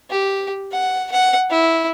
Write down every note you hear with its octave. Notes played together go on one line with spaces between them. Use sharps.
G4
F#5
F#5
E4